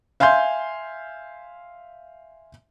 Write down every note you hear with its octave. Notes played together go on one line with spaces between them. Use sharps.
E5 F5 G#5 C6 G6